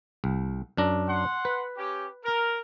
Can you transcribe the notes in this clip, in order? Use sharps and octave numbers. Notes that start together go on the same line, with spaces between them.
C2
F#2 D4 A#5
F#5 C6
B4
C#4 G4
A#4